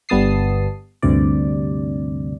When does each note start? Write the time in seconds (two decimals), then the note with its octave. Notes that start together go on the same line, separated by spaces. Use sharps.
0.09 G1 G3 B3 A5 D#6 C7
1.03 D2 G2 C3 D5